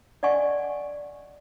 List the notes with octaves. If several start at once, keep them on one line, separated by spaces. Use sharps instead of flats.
D5 D#5 F#5 G#5 C#6